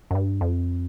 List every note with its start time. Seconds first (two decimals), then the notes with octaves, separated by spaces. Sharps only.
0.11 F#2
0.15 G2
0.41 F2